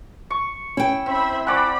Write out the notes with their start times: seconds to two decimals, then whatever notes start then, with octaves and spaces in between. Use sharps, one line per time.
0.30 C#6
0.77 C#4 E4 G5
1.06 C4 C5 E5 B5
1.47 C5 D5 F#5 G#5 B5 C#6 D6